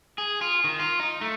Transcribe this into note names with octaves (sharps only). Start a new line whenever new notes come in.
G#4
F4
D#3
F4
D#4
A3